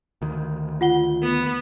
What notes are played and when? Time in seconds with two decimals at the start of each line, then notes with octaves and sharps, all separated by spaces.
0.22 D2 D#3
0.81 F4 F#5 G7
1.22 B3